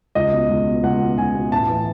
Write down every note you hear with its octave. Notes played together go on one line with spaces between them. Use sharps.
C#2 D#5
B2
C#2
B2
C#2 F#5
B2
C#2 G#5
B2
A1 A5
E3